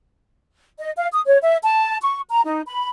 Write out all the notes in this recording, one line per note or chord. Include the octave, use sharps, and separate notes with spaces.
D#5
F5
D#6
C#5
E5
A5
C#6
A#5
D#4
B5